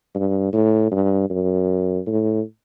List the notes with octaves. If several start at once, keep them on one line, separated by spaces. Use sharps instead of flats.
G2
A2
G2
F#2
A2